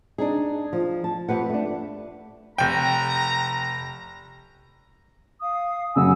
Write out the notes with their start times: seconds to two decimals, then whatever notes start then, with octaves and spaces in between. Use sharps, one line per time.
0.18 D4 D#4 G#4
0.73 F3
1.04 A5
1.28 F2 G4 B4 F#5
1.49 A3 D4
2.58 F1 G5 A#5
5.41 F5 D#6
5.96 F#2 C#3 F#5 G#5 E6